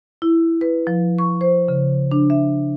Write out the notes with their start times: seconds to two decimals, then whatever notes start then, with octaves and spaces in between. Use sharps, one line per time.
0.22 E4
0.61 B4
0.87 F3
1.19 C#6
1.41 C5
1.68 C#3
2.11 D4
2.30 E5